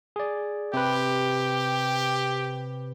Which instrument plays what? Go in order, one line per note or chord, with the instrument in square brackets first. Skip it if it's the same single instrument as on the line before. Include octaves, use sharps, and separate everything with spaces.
[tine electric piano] G#4 D5
[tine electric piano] C3 B4 [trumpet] G4